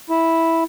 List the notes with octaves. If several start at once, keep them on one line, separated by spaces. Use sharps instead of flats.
E4